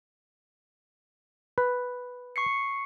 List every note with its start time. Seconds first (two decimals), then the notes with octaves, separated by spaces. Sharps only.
1.58 B4
2.36 C#6 C7 C#7